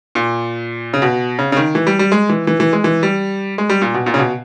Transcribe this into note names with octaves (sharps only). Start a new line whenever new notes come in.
A#2
C#3
B2
C#3
C#3
D#3
E3
G3
G3
G#3
E3
E3
E3
G#3
E3
G3
G#3
G3
A#2
B2
A#2
C#3
B2